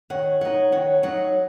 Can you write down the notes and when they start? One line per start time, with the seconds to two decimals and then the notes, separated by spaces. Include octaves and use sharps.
0.10 D#3 C#5 F#5
0.41 F#3 D#4 C#5 F#5
0.72 D#3 C#5 F#5
1.03 F#3 D#4 C#5 F#5